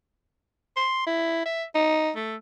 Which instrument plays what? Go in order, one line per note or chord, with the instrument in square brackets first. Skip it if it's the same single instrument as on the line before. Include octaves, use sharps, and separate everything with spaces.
[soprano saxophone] C6
E4
E5
D#4
A3